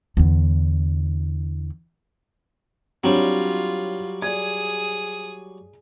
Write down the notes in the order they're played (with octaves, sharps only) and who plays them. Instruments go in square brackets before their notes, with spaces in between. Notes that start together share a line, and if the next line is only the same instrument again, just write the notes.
[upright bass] E2 D3
[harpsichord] F#3 G3 [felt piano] C4 D4 C#5 [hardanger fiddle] F4
[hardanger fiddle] G#4 D#6 [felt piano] D5 G#6